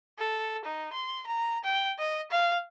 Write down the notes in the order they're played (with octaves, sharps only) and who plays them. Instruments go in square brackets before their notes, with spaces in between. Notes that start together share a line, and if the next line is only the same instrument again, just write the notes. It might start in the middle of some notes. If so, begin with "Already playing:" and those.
[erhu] A4
D#4
C6
A#5
G5
D#5
F5